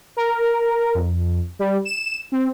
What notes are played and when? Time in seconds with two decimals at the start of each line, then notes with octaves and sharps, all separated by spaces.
0.17 A#4
0.94 F2
1.59 G3
1.85 E7
2.32 C4